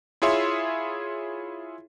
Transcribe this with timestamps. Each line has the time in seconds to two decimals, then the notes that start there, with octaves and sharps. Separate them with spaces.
0.22 E4 F4 G#4 C#5 E5 C6